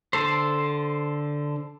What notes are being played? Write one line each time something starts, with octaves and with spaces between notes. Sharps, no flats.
D3 A4 C5